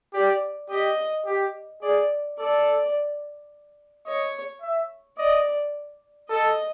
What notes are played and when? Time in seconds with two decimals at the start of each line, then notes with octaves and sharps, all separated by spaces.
0.14 G4 D5
0.70 G4 D#5
1.26 G4
1.82 G#4 D5
2.38 A4 D5
4.05 C#5 D#5
4.61 E5
5.18 D5 D#5
6.29 A4 D#5